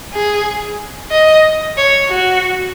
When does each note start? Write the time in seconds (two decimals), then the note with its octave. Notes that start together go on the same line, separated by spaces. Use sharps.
0.14 G#4
1.11 D#5
1.77 C#5
2.09 F#4